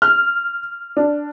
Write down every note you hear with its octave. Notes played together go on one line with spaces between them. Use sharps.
F6
D4